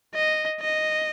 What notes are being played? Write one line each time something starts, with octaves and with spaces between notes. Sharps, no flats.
D#5
D#5